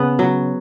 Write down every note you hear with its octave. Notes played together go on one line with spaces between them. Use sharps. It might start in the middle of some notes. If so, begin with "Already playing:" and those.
Already playing: C#3 B3
F#3